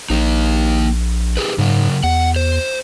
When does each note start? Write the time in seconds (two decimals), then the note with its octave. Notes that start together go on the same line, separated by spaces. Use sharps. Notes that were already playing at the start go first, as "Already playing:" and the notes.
0.10 A#1 A#3 D#4
1.37 G4 G#4 B4
1.58 G#2 C#3 F#3
2.04 E2 F#5
2.36 C5